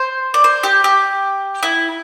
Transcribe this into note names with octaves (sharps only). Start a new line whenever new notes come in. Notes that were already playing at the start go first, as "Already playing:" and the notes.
Already playing: C5
D5
C5
G4
G4
E4